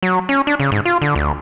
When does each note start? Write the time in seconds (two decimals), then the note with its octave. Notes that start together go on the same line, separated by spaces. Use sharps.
0.03 F#3
0.29 C#4
0.47 D4
0.60 C#3
0.72 G#2
0.85 F4
1.02 D3
1.15 D2